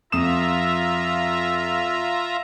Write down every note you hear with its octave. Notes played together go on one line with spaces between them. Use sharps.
F2 F4 E5 A#5 D#6 E7